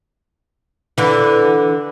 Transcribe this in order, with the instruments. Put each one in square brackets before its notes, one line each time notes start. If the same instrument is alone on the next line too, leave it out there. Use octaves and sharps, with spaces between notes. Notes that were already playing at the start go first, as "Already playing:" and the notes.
[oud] D3 E3